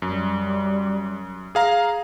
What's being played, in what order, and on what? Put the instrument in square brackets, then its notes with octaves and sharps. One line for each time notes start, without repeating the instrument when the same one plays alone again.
[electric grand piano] F#2 [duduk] G3
[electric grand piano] G#4 F5 A#5